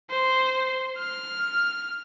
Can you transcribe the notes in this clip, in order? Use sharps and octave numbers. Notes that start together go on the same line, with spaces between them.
C5
F6